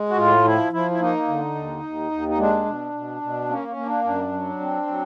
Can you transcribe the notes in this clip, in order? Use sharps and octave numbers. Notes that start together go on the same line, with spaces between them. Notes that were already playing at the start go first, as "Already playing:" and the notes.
Already playing: G#3
F#4
A2 F4
F3 E4
F3 E4
E4
A#3 D#4
D3
D#2
D#2
D#2
D#4
G#3 D4
B2
B2
B2
A#3 C#4
C#4
A#3
D4
F#2 D4
F#3
C4
F#3